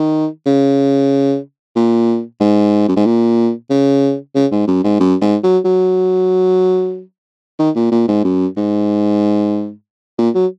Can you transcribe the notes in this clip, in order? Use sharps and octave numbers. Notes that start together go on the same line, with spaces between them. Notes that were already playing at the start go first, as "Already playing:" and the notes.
Already playing: D#3
C#3
A#2
G#2
F#2
G#2
A#2
C#3
C#3
G#2
F#2
G#2
F#2
G#2
F#3
F#3
D#3
A#2
A#2
G#2
F#2
G#2
A#2
F#3